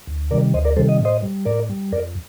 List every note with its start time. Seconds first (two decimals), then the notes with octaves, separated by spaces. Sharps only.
0.07 D2
0.31 C3 D#3 G3 A#4 D5
0.54 D2 C5 D#5
0.65 A#4 D5
0.76 C3 D#3 G3 A4 C5
0.89 D#5
1.00 A2
1.05 C5 D#5
1.23 G3
1.45 A2 A#4 D5
1.69 G3
1.92 F2 A#4 D5